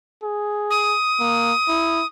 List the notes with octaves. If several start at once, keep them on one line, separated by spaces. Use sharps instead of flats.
G#4
D#6
A#3
E4